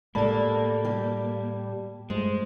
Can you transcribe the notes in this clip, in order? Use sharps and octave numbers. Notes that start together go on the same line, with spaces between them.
A2 G#3 A#3 G4 A4 D5 A5 B5
G3 G4
G2 F3 G#3 A3